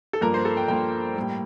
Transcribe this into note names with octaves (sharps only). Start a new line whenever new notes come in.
A4
G2 F3 A#3 A#4
C5
A4
G5
G2 F3 A#3 G5
A2 G3 A#3